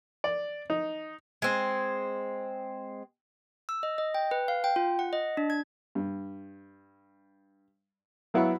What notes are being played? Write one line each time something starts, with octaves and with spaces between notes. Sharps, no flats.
D5
D#4
G#3 C4
E6
D#5
D#5
G5
B4
F5
G5
F4
F#5
D#5
D4
G#6
G2
F#3 B3 E4 F5 F#5 B5